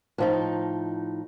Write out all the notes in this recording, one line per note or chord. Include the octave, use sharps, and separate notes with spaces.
A2 F3 D#4